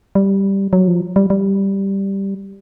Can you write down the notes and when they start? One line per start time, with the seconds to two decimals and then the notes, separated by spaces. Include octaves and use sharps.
0.15 G3
0.73 F#3
0.88 F3
1.16 G3
1.30 G3